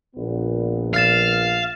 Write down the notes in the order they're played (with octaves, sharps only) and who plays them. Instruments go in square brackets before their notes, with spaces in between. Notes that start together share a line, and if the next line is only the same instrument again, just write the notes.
[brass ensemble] A#1 A#2 B3
[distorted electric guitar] F5 [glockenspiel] F6 A6 E7